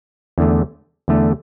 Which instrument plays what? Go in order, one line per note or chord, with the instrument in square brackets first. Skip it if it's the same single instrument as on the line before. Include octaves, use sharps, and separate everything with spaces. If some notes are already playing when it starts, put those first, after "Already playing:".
[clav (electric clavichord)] E2 D3 A3
E2 D3 A3